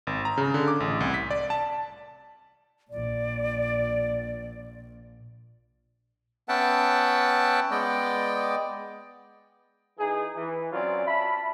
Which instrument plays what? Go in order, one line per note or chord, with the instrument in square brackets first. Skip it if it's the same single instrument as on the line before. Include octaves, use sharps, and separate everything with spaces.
[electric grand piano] G#1
A#5
C#3
D3
D6
A1
C2
B6
D5
A5
[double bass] A#1 A#2 [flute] D5
[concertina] B3 C#4 E5 F#5 G5 A5
G#3 B3 D5 D#5 G5
[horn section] E3 D#4 G#4
E3
F#3 C4 C#4 F4 D5
E5 A5 B5